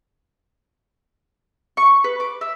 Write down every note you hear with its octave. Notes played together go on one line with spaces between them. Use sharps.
C#6
B4
D6
E5